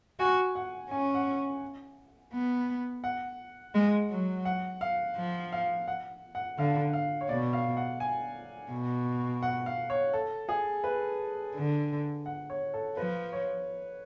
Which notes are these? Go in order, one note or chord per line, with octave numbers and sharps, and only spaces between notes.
F#4 G#5
F#5
C#4 G#5
F#5
B3
F#5
G#3
F#3
F#5
F5
F3
F5
F#5
F#5
D3 F5
F5
C#5
B2 D5
F5
F#5
G#5
B2
F#5
F5
C#5
A4
G#4
B4
D3
F#5
C#5
A4
F3 B4
C#5